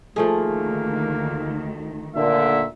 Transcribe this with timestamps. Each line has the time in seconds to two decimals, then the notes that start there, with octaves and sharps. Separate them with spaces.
0.16 D2 D#3 F3 A3 A#3 G#4
2.16 A#2 D3 E5